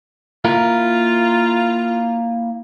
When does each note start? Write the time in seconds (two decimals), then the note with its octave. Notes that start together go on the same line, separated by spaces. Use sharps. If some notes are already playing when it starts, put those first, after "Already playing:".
0.45 A#3 E4 F4 A#4